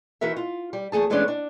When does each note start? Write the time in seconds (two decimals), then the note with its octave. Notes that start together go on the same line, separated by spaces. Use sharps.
0.21 E3 D#4 F#4 A#4 E5
0.37 F4
0.73 G3
0.92 E2 G#2 A3 G#4 A5
1.10 E3 G#3 A3 B3 C#4 D4
1.28 D4